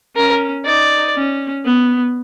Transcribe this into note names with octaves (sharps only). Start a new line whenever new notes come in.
C#4 A#4
D#4 D5
C#4
B3